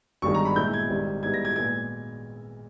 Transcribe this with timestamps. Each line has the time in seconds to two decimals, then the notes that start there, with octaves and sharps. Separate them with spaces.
0.22 G1 G2 D#3 G#3 C#6
0.34 A#5
0.45 B5
0.56 A#2 G#3 B3 E4 G6
0.73 G#6
0.89 G#1 G#2 G3
1.23 G#2 G3 B3 E4 G#6
1.34 A#6
1.45 G#6
1.56 A#2 G#3 B3 G#6